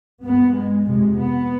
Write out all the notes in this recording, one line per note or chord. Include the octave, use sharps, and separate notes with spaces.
G2 B3
G#3
F2 C3 G#3
B3